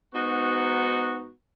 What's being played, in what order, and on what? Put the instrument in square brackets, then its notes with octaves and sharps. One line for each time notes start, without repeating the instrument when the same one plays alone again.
[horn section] G#2 B3 D#4 F#4